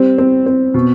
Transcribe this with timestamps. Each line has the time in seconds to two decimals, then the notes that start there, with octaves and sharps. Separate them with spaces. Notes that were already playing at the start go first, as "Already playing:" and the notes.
Already playing: G3 C4
0.18 C4
0.46 C4
0.74 B2